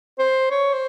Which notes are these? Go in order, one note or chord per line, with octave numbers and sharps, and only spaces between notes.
C5
C#5
C5